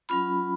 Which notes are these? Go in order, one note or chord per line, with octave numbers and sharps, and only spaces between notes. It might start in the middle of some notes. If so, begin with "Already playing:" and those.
F#3 C#4 F4 B5